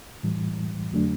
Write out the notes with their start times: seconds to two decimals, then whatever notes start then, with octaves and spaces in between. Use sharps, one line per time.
0.23 A2 E3 G3
0.92 F2 D3 F#3 A3 D4